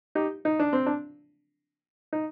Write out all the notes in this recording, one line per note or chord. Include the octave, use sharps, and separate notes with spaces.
D#4 G4
D#4
D4
C4
D4
D#4